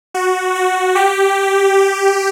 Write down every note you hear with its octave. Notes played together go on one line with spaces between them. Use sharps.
F#4
F#4
G4